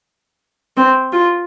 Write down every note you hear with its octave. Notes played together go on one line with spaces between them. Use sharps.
C4
F4